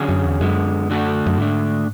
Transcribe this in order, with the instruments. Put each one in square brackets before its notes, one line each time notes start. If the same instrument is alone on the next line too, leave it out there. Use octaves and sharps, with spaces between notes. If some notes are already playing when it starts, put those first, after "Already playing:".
Already playing: [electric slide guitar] D3 F#3 C#4 G#4
[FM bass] F#2
E2
[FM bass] F#2 [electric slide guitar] D3 G#3 B3
[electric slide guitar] D3 A3 D4 F#4 A4
[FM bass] F#2
[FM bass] G#2 [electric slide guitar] D3 A3 D4